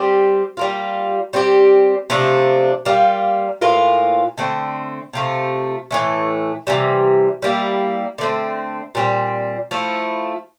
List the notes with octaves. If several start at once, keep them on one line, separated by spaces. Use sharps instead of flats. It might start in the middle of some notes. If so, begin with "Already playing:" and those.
Already playing: G3 C4 G4
G3 A#3 F4
G3 C4 G4
C3 F3 A3 D4
G3 A#3 F4
A2 E3 A#3 F4
D3 A3 C4
C3 F3 A3
A2 E3 A3
C3 E3 G3
G3 A#3 E4
D3 A3 C4
A#2 G3 C4
F3 A3 E4